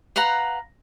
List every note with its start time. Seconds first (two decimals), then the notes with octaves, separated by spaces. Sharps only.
0.16 B4 F5 F#5 A#5